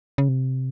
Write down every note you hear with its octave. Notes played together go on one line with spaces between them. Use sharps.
C#3
C3